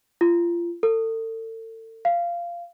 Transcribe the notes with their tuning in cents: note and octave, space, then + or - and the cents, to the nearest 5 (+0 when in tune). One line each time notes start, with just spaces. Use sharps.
F4 -30
A4 +35
F5 -15